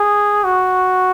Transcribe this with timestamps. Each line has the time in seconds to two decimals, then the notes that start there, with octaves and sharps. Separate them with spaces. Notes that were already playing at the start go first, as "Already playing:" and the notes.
Already playing: G#4
0.44 F#4